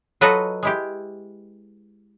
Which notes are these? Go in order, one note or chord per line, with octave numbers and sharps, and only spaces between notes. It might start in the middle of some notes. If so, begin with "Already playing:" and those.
F#3 F4 F#4 A4 B4 D#5
G#3 E4 G4